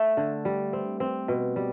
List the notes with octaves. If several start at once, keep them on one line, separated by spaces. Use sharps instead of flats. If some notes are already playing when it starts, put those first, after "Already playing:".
Already playing: A3
D3
G3
C4
C4
B2
G3